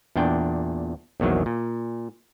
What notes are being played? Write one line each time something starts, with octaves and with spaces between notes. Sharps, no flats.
E2 A#2 D4 G5
A#1 E2 D#3 F#3
A#2